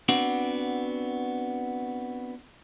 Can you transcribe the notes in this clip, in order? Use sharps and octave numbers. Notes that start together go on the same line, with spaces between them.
B3 C4 D4 F#4